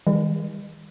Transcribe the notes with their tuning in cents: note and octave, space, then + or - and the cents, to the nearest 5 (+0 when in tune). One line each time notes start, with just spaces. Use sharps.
D#3 +40 G#3 -45